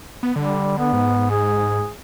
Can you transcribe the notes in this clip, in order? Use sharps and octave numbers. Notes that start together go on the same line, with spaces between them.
B3
D3 G3
B3
G#2
G#4